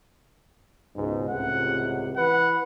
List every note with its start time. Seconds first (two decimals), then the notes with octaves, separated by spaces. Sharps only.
0.95 C#2 G#2 B2
1.29 C#2 A2 C3 F#5
2.17 E3 B4 F#5